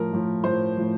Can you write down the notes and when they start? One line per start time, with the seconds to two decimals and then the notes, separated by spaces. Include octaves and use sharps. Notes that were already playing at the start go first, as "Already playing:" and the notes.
Already playing: A2 F3 A#4
0.12 A2 F3
0.44 A2 F3 C5
0.77 A2 F3